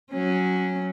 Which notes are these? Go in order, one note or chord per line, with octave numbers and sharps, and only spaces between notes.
F#3 C#4